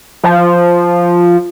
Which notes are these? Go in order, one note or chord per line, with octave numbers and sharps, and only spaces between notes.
F3